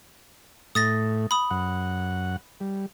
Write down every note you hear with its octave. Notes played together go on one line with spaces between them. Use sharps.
A2 A3 D#6 A6 A#6
B5 D#6
F#2 F#5
G3